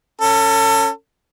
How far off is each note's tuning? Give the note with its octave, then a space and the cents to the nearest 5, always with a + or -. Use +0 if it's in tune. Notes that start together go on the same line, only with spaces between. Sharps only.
C#4 +0 A4 +30